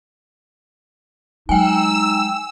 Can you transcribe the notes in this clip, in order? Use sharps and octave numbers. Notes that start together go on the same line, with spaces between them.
F#3 G#3 D#4 G5 G#5 E6